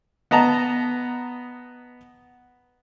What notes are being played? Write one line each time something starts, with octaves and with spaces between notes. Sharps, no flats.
B3 D#5 A5 A#5